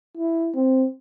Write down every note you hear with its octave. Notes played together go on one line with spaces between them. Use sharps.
E4
C4